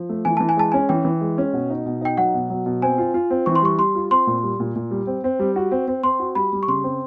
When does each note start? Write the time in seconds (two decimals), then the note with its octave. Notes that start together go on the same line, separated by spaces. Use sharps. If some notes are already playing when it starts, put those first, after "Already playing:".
Already playing: F3
0.09 A3
0.25 E3 G#5
0.37 E3 A5
0.49 G#5
0.57 G#3 A5
0.72 C#4 G#5
0.89 E3 G5
1.05 E3
1.21 G#3
1.38 C#4
1.53 B2
1.70 D#4
1.86 B2
2.01 D#4 G5
2.17 F#3 F#5
2.34 B2
2.50 F#3
2.66 B2
2.82 C4 G#5
2.98 F4
3.14 F4
3.30 C4
3.46 E3 C#6
3.55 C6
3.62 G3 C#6
3.78 G3 C6
3.95 F4
4.11 C4 C6
4.27 A#2
4.43 G3
4.60 A#2
4.76 A#2
4.91 G3
5.07 C4
5.24 C4
5.39 G3
5.56 F#4
5.71 C4
5.88 C4
6.03 C4 C6
6.19 F#4
6.35 G3 B5
6.53 G3
6.63 C#6
6.68 C#3 C6
6.84 C4